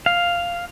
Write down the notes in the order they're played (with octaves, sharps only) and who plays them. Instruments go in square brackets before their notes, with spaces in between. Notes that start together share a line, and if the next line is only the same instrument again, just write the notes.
[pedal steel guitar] F5